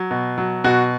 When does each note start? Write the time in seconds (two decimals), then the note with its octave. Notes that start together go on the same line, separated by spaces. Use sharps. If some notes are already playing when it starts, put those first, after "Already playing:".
Already playing: F#3
0.11 B2
0.38 F#3
0.64 B2 F#4